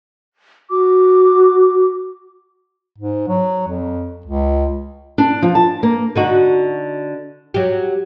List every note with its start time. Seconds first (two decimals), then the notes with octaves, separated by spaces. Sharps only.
0.70 F#4 D6
2.98 G#2
3.28 F#3
3.68 F2
4.26 C#2
5.18 D4
5.42 F3
5.55 A5
5.83 A#3
6.16 D3 D#4 F#4
7.54 F#3 G4